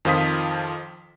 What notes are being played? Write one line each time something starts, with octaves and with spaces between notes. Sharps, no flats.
F2 D#3 F3 F4 D#6 B6